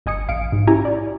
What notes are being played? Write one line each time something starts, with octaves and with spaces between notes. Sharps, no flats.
G1 D#5 G#5 D#6 C#7
A#1 F5 C#7 D7
G#2
C#4 E4 G4 G#5 A#5
D5